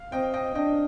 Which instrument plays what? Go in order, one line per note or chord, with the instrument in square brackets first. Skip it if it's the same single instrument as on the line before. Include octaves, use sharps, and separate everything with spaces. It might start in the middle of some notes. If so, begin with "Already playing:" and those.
Already playing: [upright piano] F5
[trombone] C4 [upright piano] D#5 G5
[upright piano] D#5 G5
[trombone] D4 [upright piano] D#5 G5